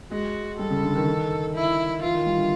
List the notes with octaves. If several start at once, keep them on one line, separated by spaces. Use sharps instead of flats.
G#3 F#4
G3 A4
C#3
D3
D#3
E4
E3 F4
D#3
G3
D3